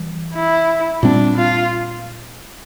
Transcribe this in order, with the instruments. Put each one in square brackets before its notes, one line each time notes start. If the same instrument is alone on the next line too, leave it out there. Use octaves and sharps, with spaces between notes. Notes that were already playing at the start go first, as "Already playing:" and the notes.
Already playing: [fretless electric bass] E3 G3
[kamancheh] E4
[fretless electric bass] A#2 G3 C4 [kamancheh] D4
[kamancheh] F4